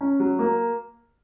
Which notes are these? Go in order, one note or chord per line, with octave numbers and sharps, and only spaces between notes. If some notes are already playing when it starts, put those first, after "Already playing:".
C#4
F#3
A#3